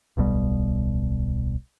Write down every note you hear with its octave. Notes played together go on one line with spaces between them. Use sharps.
D1 B1 B2 G3